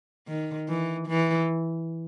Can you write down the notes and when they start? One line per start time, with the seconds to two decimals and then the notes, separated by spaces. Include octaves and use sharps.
0.28 D#3
0.69 E3
1.08 E3